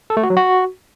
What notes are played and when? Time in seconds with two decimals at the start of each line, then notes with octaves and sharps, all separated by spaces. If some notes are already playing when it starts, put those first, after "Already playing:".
0.10 A4
0.17 A3
0.23 F#4
0.30 F#3
0.37 F#4